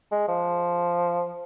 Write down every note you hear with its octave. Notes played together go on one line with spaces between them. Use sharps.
G#3
F3